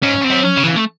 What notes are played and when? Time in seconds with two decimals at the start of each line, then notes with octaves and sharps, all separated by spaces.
0.03 G#2 C#4
0.24 C4
0.30 F#2
0.43 C#4
0.57 C#3
0.64 E3
0.76 A3